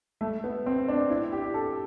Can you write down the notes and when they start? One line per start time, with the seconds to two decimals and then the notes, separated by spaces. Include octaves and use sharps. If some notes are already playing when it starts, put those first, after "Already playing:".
0.21 A3
0.44 B3
0.66 C4
0.88 D4
1.10 E4
1.32 G4
1.54 A4